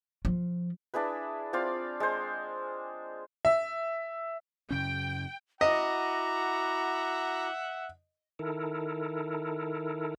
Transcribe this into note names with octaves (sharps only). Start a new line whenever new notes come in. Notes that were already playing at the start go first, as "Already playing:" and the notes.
F3
D4 E4 G#4 B4
C4 F4 D5 F5
G#3 C5
E5
F#2 C#3 C#4 G5
E4 F#4 D#5 E5 F#5 A#5 D6
D#3 E4 A4 A#4